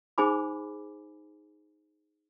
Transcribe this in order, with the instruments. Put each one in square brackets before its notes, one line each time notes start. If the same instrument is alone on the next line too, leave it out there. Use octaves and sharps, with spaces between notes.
[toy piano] D#4 G#4 C5 G#5 B5 D6